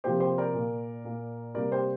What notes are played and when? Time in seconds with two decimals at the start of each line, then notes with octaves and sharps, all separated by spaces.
0.04 C3 F3 A#3 G4 C5
0.20 G4 C5
0.38 A#4 D5
0.54 A#2 A#3
1.05 A#2 A#3
1.55 C3 G3 A#3 A#4 D5
1.72 G4 C5